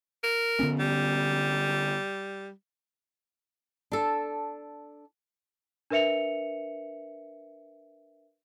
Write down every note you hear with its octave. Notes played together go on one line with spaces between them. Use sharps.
A#4
D3 B3 C#4
G3
D4 A4
D4 A#4 B4 E5 C#7 F7